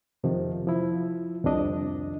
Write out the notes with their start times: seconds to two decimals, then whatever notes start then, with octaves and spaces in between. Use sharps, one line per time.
0.24 F2 C3 D#3 F3
0.67 F3 E4
1.44 C2 F2 C3 D#3 D4 D#5